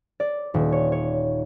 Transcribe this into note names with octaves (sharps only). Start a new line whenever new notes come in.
D5
D#1
C#5
C#5